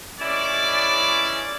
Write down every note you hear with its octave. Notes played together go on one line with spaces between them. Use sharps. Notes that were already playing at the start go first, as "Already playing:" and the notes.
E3 G#3 C#4 E4 D5